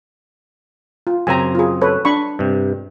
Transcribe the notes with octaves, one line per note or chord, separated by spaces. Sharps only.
F4
F#2 C#3 C4 G#5 A#5
F4 G#4
A4 B4 C#5
D4 B5 C#6
G2 C3